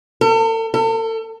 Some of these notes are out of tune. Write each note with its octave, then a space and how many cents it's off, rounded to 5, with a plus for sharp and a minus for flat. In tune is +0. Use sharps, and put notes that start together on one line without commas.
A4 +40
A4 +40